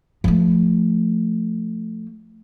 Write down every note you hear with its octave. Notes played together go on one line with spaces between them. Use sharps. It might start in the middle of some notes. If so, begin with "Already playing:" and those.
F3 A3